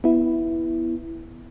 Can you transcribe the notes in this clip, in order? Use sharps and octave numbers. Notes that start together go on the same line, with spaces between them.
B3 E4